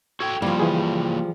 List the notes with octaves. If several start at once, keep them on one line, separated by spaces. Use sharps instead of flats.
F#4 A4 G5 G#6
F3 G3 A#3 E4
E3 G#4